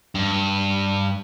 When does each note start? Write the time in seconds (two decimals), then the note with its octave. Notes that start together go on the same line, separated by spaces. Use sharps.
0.15 G2